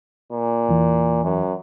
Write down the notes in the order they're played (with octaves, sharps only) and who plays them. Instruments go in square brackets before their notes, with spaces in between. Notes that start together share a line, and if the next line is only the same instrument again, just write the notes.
[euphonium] A#2
[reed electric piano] E2 E3
[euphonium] F#2